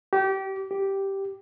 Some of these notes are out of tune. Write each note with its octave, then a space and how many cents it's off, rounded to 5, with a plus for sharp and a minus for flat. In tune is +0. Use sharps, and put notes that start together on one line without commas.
G4 -25
G4 -5